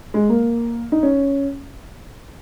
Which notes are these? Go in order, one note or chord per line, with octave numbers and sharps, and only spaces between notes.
G#3
A#3
D#4
C#4